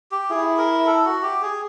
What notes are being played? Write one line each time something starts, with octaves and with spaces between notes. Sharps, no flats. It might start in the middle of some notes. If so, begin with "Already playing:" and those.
G4
E4 G#4
A#4
A4
F#4
G4
G#4